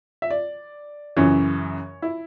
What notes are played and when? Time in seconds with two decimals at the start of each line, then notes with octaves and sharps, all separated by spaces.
0.22 E5
0.30 D5
1.17 F#2 C#3 E3 C#5
2.02 E4